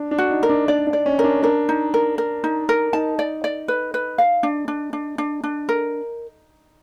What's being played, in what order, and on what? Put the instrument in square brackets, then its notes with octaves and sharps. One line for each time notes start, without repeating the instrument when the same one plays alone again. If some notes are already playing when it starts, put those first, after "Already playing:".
Already playing: [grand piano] D4
D4
[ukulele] F#4
[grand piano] D#4
[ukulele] A#4
[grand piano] D4
[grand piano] D4 [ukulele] D5
[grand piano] D4
[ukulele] D5
[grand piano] C#4
[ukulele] A#4
[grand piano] D4
[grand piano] D4 [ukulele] A#4
[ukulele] D#4
A#4
A#4
D#4
A#4
[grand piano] D#4 [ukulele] A5
[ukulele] D5
D5
B4
B4
F5
D4
D4
D4
D4
D4
A#4